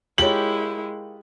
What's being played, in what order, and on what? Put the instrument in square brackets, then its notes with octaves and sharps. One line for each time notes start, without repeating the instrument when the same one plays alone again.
[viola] G#3 E4 [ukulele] F4 A#4 C#5 [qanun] G4 [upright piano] F#7